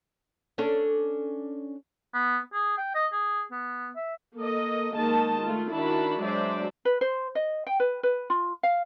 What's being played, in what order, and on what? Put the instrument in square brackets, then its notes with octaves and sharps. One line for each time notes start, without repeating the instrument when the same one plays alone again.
[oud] C#4 D4 A4
[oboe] B3
G#4
G5
D#5
G#4
B3
E5
[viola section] A#3 A4 D#5
D#3 G#3 A#3 D#5 A5
A3 F4
D#3 D4 E4 F#4 A5 B5
F#3 G#3 D4 C5 D5 E5
[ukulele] B4
C5
D#5
G5
B4
B4
F4
F5